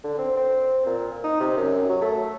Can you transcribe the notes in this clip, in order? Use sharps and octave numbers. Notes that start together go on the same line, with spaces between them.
D3
C4
C4
A#2
D#4
C3
F#2
F#3
A3